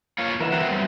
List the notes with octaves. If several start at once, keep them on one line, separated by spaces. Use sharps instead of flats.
A#3 F4 C#5
E3 A#4 E5 F#5
F#3 B3 C4
G3